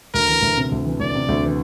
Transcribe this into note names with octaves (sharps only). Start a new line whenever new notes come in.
D2 A#4
E3
D2
C3
D2
E3
D2 D5
C3
D2
E3